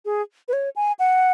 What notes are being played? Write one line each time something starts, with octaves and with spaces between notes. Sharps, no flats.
G#4
B4
C#5
G#5
F#5